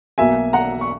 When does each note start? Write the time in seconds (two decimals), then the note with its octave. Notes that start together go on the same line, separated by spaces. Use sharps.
0.18 B1 B2 A#3 E5 G#5
0.53 F#5 A#5
0.81 C#6